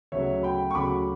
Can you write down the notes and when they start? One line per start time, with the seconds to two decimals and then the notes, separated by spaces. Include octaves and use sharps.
0.12 D2 C#3 F#3 C#5 E5
0.43 G5 B5
0.71 C#6
0.75 D2 C#3 F#3 B5 D6